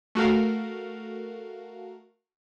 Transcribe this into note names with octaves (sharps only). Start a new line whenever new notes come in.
A3 F#4 A#4 F5